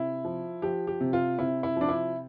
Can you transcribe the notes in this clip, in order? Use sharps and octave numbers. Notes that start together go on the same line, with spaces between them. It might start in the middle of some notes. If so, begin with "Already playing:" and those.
Already playing: C3 E4
F3
F3 G4
G4
C3
F4
C3 E4
E4
F3 D4
E4